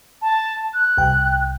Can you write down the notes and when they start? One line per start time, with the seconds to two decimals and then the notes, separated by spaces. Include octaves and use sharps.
0.22 A5
0.74 F#6
0.98 C2 G5